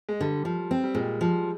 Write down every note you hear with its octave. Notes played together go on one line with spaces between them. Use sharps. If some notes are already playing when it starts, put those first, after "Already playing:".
G#3
D3 G3
F3
C4
G3
A#2 G#3
F3